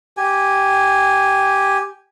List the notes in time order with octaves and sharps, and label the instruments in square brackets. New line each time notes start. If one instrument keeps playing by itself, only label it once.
[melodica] G4 G#5